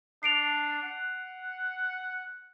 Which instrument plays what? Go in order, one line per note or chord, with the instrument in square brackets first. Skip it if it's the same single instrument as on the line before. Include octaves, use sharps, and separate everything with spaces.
[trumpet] D4 [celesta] C7 D7 F7
[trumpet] F#5